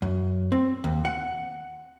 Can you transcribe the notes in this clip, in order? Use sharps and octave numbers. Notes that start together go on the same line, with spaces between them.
F#2
C4
D#2
F#5